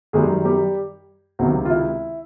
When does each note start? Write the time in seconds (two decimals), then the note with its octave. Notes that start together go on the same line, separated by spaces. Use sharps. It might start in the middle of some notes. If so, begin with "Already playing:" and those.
0.13 F#2 D#3 G3 G#3 G#4
0.45 G3 G4
1.39 C#2 C3 D#3 F#3 F#4
1.65 F4
1.70 E4